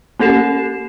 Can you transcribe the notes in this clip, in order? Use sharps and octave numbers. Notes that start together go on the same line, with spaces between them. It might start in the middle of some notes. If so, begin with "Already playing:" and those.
A#3 C#4 A4 C7 E7